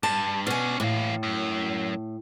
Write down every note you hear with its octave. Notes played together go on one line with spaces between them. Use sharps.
G2 A5
B2 C#4 D4 G#5
A2 E3 F5
F#2